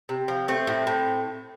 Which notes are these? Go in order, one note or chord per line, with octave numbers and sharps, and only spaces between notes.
C3
F3
A3 C4
A2
A2